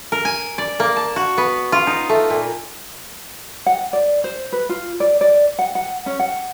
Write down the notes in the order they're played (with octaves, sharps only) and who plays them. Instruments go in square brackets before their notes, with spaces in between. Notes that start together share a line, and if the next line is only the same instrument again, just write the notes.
[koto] A#4
G#5
D5
A#3
A5
F#4
B3
F4
D#4
A3
A#2
[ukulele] F#5
D5
C5
B4
F4
D5
D5
F#5
F#5
C#4
F#5